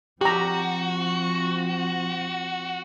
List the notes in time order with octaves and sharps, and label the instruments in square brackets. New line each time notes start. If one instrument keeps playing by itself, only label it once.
[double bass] F3 C4 [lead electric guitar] F#4 [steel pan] G4 A#5